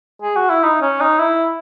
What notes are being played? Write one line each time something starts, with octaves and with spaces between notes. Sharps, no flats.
G#4
F#4
E4
D#4
C#4
D#4
E4